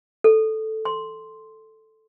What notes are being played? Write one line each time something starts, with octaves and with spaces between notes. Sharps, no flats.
A4
C6